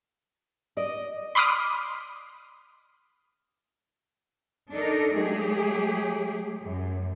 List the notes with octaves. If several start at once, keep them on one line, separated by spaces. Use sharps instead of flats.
D5 D#5
B5 C6 D6 D#6 F6
D4 D#4 A4 A#4 D#5
F#3 G#3 A3 G4 G#4
F#2